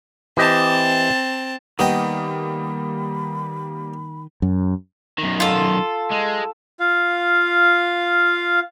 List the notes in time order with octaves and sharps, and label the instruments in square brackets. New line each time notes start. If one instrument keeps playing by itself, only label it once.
[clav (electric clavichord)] E3 G4 D#5 [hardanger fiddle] C4 A5
[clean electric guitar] D#3 [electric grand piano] G3 A#3 D#6 [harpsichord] B3 D#5 G5 [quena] B5
[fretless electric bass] F#2
[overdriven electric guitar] F#2 D#3
[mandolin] F4 A4
[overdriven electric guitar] G#3
[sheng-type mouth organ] F4 F5